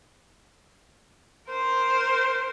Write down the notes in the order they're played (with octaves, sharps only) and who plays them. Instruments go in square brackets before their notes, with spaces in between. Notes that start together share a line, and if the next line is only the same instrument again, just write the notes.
[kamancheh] A#4 C5